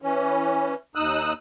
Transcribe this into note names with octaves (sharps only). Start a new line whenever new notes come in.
E3 C#4
D#2 D#4 D#6 E6 F#6